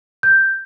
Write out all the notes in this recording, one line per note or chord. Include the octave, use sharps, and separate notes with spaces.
G6